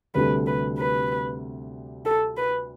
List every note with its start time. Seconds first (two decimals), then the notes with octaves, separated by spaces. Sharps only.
0.14 D2 C3 G3 D4 A4 B4
0.47 B4
0.78 B4
2.05 A4
2.37 B4